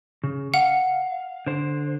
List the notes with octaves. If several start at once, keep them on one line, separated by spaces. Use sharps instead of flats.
C#3
F5 F#5
D3 C5